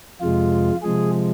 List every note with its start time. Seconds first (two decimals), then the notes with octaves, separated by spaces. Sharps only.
0.21 F2 C3 G#3 F4
0.83 C3 F3 G#3 G#4